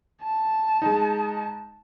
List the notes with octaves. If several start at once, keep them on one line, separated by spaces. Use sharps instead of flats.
A5
G#3 D#4